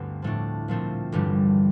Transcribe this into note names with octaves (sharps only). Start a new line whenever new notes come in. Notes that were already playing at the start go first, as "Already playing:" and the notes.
Already playing: G1 D2 G2 D3 C4
A2 F3 A3 D4
A#2 F3 A3 C4
A1 G2 D3 G3